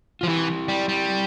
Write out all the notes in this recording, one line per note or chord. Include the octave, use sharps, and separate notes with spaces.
F3 F4
E3 E4 G4
G3
G3